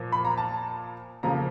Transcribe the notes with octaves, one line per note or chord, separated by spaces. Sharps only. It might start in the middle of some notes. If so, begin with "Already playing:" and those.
Already playing: A#2 F3 A#3
B5
A#5
A5
F2 C#3 F3 A#3 A#5